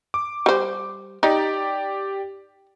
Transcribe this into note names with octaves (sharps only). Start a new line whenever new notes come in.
D6
G3 C5
D#4 G4 D5